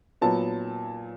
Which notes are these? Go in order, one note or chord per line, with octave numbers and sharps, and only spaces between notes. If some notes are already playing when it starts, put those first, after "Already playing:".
A#2 F#3 B3 A5